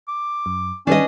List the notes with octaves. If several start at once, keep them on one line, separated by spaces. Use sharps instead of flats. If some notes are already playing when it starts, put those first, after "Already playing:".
D6
F#2
D#3 G3 C#4 D4 B4 D#5